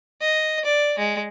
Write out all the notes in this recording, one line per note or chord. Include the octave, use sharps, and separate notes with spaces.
D#5
D5
G#3